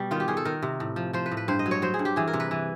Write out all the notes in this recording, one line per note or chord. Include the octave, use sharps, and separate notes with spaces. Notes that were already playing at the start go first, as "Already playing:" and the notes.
Already playing: B2 G3
D#3 F4
G4
D#3 G#4
A4
D#3 A#4
C3
A2
F3
F3 C5
B4
A2
B4
G2 C5
D#5
F#3
C#5
F#3 C5
G#4
G2
G4
E3 G#4
A#4
C3
B4
E3